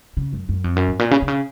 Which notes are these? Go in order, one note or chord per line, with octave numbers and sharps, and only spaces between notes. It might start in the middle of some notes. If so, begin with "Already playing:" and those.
C#3
F#2
F#2
F2
F#2
G#2
A#2
C#3
C3
C#3